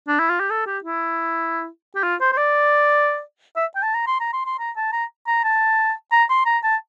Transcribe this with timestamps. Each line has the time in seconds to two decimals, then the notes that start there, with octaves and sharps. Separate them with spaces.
0.08 D4
0.19 E4
0.30 F4
0.40 G4
0.50 A4
0.66 G4
0.84 E4
1.95 G4
2.03 F4
2.21 C5
2.32 C5
2.37 D5
3.56 E5
3.76 G5
3.83 A5
3.94 A#5
4.07 C6
4.20 A#5
4.33 C6
4.46 C6
4.59 A#5
4.76 A5
4.92 A#5
5.27 A#5
5.44 A5
6.12 A#5
6.30 C6
6.46 A#5
6.64 A5